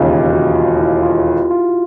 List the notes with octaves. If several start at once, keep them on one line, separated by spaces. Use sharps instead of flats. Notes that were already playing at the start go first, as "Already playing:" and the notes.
Already playing: E1 D#2 C#3 F4
G4
F#4
F4
E4
F4
F4